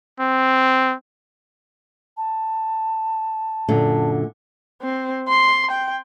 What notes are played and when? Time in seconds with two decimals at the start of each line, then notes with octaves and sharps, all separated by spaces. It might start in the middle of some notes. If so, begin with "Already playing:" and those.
0.20 C4
2.17 A5
3.68 F#2 A#2 D3
4.82 C4
5.28 C6
5.71 G5